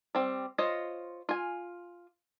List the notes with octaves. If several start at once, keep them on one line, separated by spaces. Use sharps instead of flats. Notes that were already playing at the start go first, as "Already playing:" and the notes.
G3 C4
F4 C5 C#5 D#5
F4 G#5